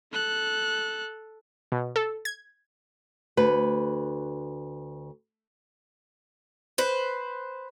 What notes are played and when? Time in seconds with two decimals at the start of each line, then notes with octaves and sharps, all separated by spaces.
0.13 A4 F#6
1.72 B2
1.96 A4
2.25 G#6
3.37 D2 B4
6.78 B4 C5